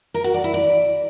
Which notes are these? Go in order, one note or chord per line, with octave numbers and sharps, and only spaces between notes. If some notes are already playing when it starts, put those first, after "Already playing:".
A#4
F#4
D5
E4
D5